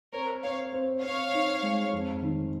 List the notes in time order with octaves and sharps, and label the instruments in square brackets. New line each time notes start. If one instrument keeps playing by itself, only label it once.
[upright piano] C4 [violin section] A#4 C#5
[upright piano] C4 [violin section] C#5 F5
[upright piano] C4
[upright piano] C4 [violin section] C#5 F5
[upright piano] D#4
G#3
F2
D#3